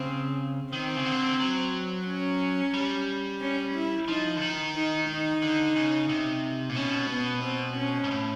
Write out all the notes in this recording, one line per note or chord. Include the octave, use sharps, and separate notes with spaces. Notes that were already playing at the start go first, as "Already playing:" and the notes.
Already playing: C#3 C4
D#3 C4
C#3
D3
F#3
C#4
G3
C#4
E4
F3 D#4
D3
D#3
D#4
D#4
D3
C#3
C3
A#2
B2 C#4
B3
C4
C#4
G#2
A2